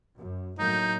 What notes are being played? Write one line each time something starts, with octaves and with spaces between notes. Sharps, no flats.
F#2
A2 F#3 A#3 D#4 G6